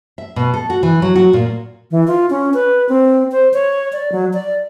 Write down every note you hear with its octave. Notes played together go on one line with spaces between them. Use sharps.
E5
B2
A4
F#4
E3
F#3
F#4
A#2
E3
F4
C#4
B4
C4
C5
C#5
D5
F#3
D5